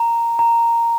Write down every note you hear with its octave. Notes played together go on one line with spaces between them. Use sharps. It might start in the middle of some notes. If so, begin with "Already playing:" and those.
Already playing: A#5
A#5